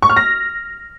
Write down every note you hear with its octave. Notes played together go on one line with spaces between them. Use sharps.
C#6
F6
A#6